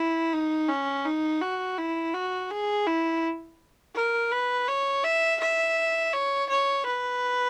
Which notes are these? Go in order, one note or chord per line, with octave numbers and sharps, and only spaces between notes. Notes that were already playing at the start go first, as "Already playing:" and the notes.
Already playing: E4
D#4
C#4
D#4
F#4
E4
F#4
G#4
E4
A#4
B4
C#5
E5
E5
C#5
C#5
B4